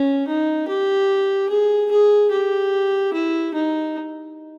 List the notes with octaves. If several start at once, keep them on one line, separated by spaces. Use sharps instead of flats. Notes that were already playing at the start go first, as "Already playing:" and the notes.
Already playing: C#4
D#4
G4
G#4
G#4
G4
E4
D#4